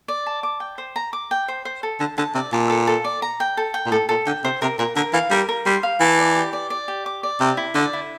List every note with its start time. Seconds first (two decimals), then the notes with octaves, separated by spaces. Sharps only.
0.08 D5
0.26 A5
0.43 D6
0.60 G5
0.78 C5
0.96 A#5
1.13 D6
1.31 G5
1.48 C5
1.65 C5
1.83 A4
2.00 D3 A5
2.18 D3 A5
2.35 C3 D5
2.53 A#2 A5
2.70 A4
2.87 A4
3.04 D5
3.22 A#5
3.40 G5
3.57 A4
3.74 G5
3.86 A#2
3.91 A2 A4
4.09 A#2 A4
4.26 D3 G5
4.44 C3 C5
4.62 C3 A#4
4.79 A#2 A#4
4.96 D3 A#4
5.13 E3 F5
5.31 G3 A#4
5.49 A#4
5.66 G3 C6
5.83 F5
6.00 E3 A5
6.19 D5
6.36 G4
6.53 D5
6.70 D5
6.88 G4
7.06 D6
7.23 D5
7.40 C3 G4
7.57 E4
7.75 D3 D5
7.93 E4